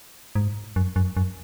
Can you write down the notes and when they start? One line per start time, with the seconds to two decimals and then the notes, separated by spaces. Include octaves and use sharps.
0.35 G#2
0.76 F#2
0.96 F#2
1.17 F#2